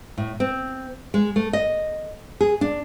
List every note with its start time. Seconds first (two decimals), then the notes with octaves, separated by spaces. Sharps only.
0.18 A2
0.40 C4
1.14 G#3
1.36 A3
1.53 D#5
2.41 G#4
2.61 D4